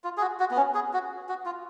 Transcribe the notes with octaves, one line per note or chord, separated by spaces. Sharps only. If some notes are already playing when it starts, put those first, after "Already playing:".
F4
G#4
F#4
F#4
B3
C#4
G#4
F#4
F#4
F4